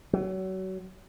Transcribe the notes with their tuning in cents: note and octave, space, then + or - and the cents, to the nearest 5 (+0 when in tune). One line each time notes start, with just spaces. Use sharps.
F#3 +30